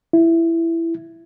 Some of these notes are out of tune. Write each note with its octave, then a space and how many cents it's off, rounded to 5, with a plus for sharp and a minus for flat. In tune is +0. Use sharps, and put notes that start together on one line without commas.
E4 +10